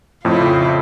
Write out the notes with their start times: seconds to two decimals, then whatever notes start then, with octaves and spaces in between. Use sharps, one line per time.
0.25 F2 A2 C#3 E4 F4